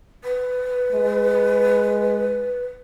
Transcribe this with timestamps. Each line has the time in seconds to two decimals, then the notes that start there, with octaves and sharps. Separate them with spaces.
0.24 B4
0.92 G#3